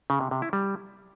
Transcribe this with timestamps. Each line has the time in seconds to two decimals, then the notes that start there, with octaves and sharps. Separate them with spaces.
0.10 C#3
0.21 C3
0.31 C3
0.42 E4
0.53 G3